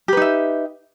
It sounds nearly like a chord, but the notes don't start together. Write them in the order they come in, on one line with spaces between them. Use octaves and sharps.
G4 B4 D#4 E5